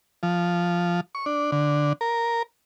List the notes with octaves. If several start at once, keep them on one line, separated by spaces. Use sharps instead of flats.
F3
C#6
D4
D3
A#4